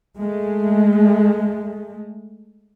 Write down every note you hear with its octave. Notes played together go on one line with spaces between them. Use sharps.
G#3 A3